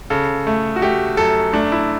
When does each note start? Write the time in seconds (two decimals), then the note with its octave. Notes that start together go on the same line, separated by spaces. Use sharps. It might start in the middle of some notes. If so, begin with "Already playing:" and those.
0.10 C#3 A4
0.47 A3
0.76 F#4
0.82 A3 G4
1.17 F#2 A4
1.53 A3 D4
1.72 E4